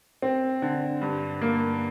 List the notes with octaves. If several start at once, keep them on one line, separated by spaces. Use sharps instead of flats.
C4
D3
G2
A#3